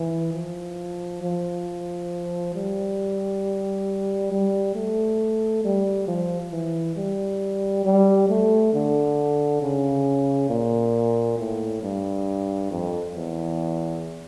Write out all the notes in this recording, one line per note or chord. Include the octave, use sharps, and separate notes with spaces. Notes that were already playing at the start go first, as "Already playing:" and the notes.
Already playing: E3
F3
F3
G3
G3
A3
G3
F3
E3
G3
G3
A3
D3
C#3
A#2
A2
G2
F2
E2